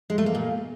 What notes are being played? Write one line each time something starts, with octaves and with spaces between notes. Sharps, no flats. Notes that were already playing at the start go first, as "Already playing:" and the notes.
G#3
A3
A#3
A#2